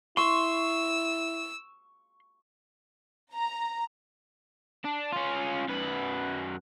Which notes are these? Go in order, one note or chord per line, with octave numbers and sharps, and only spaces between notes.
E4 C6 C#6 E6
A#5
D4
C#4 F4
F#2 B4